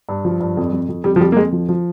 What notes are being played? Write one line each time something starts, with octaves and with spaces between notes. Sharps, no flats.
G2
F3
G2
F2
F2
F2
F2 G3
F3
F2 G3
A#3
F2 G#3
F3
F3